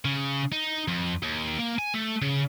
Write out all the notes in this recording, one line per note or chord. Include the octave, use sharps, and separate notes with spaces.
C#3
D#4
F2
D#2
A#3
G#5
A3
C#3